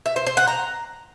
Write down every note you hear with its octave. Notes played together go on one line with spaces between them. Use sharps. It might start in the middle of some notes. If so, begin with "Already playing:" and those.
E5
C5
C5
F#5
A#5